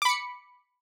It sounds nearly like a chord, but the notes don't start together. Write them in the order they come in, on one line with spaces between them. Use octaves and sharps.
D6 B5 C#7